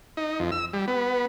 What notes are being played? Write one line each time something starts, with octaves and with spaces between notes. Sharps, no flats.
D#4
F2
E6
G3
B3